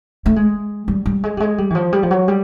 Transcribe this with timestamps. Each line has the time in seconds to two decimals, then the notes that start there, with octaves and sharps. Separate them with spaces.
0.26 A3
0.36 G#3
0.88 G3
1.06 G3
1.24 G#3
1.37 G3
1.40 G#3
1.58 G3
1.70 E3
1.75 F3
1.93 G3
2.03 F3
2.11 F#3
2.28 G3